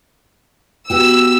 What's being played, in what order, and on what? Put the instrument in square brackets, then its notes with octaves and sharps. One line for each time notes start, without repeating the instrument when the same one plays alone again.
[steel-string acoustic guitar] B3 F#4 G4 [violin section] E6